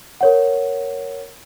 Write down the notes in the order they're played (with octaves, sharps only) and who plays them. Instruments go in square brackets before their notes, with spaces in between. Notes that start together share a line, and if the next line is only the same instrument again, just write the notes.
[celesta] A#4 C#5 F#5